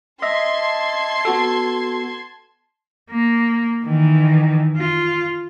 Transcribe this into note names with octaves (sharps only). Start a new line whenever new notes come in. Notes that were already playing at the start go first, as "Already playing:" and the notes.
D#5 E5 A5 C6 G#6
B3 F#4 A4
A#3
D#3 E3
F4